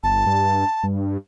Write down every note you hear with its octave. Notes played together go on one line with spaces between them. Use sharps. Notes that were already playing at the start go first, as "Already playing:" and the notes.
G1 A5
G2
G2